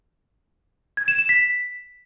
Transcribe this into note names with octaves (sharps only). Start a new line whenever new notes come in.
G#6
E7
E7
B6